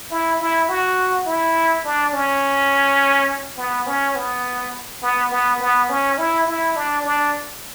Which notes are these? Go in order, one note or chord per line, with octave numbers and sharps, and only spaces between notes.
E4
E4
F#4
E4
D4
C#4
B3
C#4
B3
B3
B3
B3
C#4
E4
E4
D4
D4